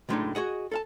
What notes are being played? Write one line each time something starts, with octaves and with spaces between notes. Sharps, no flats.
C#2 F#2 A2 G#3 D4 D#4
F#4 G#4 D#5 F#5
A4 F5 A5